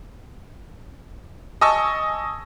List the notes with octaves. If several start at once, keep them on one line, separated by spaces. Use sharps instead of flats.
D#5 G#5 A5 C#6 E6